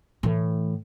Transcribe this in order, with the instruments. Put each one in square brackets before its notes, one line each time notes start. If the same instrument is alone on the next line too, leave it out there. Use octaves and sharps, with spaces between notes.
[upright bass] A2 E3